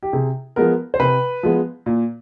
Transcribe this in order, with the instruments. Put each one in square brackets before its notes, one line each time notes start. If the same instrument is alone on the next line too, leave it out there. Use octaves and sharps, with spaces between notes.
[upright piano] G4
C3 G#4
F3 G#3 B3 A#4
C5
C3 B4
F3 G#3 B3
A#2